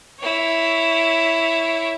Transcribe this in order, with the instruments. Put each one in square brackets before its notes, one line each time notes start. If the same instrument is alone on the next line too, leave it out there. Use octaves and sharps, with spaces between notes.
[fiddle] E4 C#5